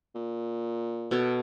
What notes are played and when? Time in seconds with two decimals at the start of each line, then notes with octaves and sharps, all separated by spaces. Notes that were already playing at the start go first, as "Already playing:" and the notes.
0.15 A#2
1.11 B2 A4 C#5